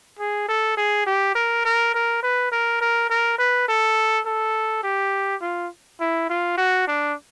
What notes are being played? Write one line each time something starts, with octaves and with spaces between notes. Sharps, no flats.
G#4
A4
G#4
G4
A#4
A#4
A#4
B4
A#4
A#4
A#4
B4
A4
A4
G4
F4
E4
F4
F#4
D4